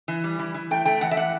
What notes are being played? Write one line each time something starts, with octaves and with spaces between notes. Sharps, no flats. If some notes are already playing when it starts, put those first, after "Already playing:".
E3
G3
E3
E3
A3 G5
A3 G5
E3 F#5
E5
E3 F#5